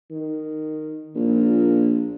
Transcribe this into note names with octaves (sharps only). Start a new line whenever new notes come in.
D#3
A#1 A#2